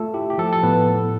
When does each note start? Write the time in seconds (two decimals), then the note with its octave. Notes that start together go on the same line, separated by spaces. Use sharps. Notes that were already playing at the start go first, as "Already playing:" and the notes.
Already playing: A3 F4 A4
0.14 E4 G4
0.30 G4
0.38 F3 A4
0.53 A4
0.63 A2 B3 B4
0.88 A2